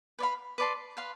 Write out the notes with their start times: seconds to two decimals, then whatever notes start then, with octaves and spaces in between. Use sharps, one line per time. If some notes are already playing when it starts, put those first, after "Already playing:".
0.19 B4 D5 F5 B5
0.58 B4 D5 A5 C6
0.97 B4 F5 C6